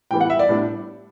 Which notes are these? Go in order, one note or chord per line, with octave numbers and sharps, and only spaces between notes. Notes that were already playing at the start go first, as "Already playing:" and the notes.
A2 E3 G3 B3 G5
F#5
E5
D5
A2 G3 B3 D4